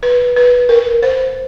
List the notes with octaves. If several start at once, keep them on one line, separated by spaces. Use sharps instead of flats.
B4
B4
A#4
C5